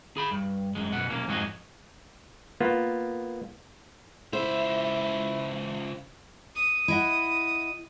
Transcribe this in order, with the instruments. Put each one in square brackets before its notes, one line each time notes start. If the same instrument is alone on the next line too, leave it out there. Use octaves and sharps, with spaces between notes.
[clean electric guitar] G#4 B5
G2
F#2 G#3
F#2 B2 F#5
B1 A#3 C#4
F2 G#2 F#4 C#5 D#5 G#5
[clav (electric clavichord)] A#3 B3 F4
[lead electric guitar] C#2 E5 [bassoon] E4 [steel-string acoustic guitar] C5
[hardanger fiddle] D#6
[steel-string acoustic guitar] E4 D#5 F#5